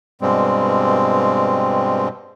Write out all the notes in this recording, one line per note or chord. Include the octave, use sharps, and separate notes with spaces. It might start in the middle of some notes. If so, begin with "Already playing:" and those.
G2 B2 G3 G#3 C4